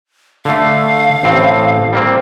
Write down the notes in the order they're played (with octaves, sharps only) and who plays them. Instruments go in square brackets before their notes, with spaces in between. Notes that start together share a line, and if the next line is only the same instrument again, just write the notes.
[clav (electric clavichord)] D3 A3 [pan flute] F5
[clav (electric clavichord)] A1 A2 C4
G3 A#3 C4